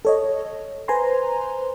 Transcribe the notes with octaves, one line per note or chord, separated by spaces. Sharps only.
A4 C#5 D#5
B4 C5 G#5 A#5 C6